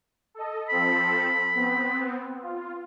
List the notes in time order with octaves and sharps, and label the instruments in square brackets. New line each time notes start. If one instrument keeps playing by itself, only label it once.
[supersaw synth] A4 D#5
[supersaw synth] F3 C4 A4 [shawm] B5
[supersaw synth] B3 C4
F4